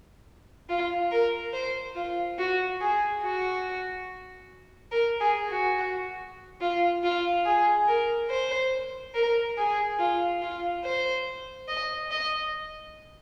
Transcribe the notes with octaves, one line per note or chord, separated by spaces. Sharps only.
F4
A#4
C5
F4
F#4
G#4
F#4
A#4
G#4
F#4
F4
F4
G#4
A#4
C5
A#4
G#4
F4
F4
C5
D#5
D#5